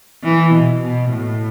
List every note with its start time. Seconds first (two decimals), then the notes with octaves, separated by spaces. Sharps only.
0.24 E3
0.52 B2
0.81 B2
1.10 A2